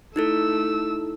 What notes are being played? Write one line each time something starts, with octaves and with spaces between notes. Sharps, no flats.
A3 D#4 E4 A4 E6